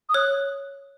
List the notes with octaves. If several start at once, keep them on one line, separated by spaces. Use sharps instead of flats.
D#6
C#5 F#6